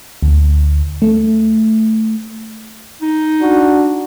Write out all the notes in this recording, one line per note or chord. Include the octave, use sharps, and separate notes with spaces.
D2
A3
D#4
D4 F#4